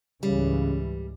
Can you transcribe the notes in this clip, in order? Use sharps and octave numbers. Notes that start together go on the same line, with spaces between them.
C#2 G#2 C#3 E3 G3